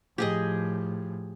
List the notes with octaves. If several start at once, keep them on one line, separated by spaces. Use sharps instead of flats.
A2 F3 G4 G#4 D#5